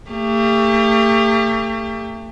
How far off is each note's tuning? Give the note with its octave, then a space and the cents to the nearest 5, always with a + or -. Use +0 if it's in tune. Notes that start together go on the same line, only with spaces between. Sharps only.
A3 +40 G4 +40